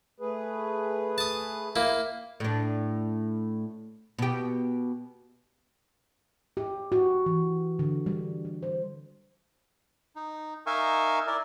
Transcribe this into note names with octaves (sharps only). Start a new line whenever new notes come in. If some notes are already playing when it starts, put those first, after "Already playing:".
A3 G#4 B4
A5 D#6
A#3 E4
A2 D4
B2 G4
G4
F#4
E3
D3
G3
G3
C5
D#4
D#4 A#4 E5 F5 G#5 C#6
E4 A#4 D5